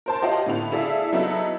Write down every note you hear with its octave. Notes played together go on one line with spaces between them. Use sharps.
A#4 C5 A5
F4 G4 C#5 D#5 F5 F#5
A2 D3 B3 F7
E4 G#4 A4 D5 E5 F5
F#3 B3 D#4 E4 A4